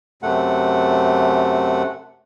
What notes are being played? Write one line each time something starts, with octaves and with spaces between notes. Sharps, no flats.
F#2 C3 A3 F#5